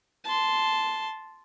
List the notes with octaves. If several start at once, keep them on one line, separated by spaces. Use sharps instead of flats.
A5 C6